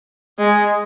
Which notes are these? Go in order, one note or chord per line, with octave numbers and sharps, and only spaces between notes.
G#3